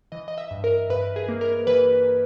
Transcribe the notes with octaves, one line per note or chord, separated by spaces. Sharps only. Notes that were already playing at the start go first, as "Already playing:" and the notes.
E3 D#5
D#5
E5
G2
A#4
G2 B4
G#4
A#3
A#4
E3 B4